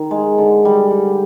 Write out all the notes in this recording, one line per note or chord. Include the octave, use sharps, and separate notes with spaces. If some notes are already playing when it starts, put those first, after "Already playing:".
Already playing: D#3
G#3
D3
G3
G3